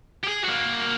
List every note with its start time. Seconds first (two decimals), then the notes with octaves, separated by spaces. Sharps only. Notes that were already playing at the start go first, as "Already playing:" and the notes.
0.24 G4 G#4
0.44 A#3 F#4